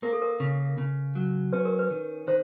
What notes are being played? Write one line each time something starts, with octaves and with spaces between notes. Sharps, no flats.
A#3 A#4
A4
A#4
C#3
C#3
F#3
C#4 B4
A#4
B4
D#3
D#3 C5